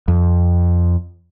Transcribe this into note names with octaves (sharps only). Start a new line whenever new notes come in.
F2